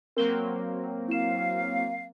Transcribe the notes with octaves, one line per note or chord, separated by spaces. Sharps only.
F#3 A#3 C4 A#4 G7
E4 F5 E7